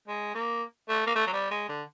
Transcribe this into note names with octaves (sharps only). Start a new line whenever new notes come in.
G#3
A#3
A3
A#3
A3
F#3
G3
G#3
D3